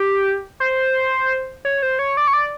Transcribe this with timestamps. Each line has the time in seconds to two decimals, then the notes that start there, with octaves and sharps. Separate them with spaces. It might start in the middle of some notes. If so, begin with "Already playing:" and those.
Already playing: G4
0.60 C5
1.65 C#5
1.82 C5
1.99 C#5
2.17 D5
2.27 C#5
2.33 D5